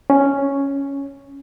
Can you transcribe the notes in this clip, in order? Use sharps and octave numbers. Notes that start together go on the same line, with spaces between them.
C#4